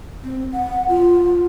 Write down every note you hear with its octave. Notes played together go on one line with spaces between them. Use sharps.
C4
F#5
F4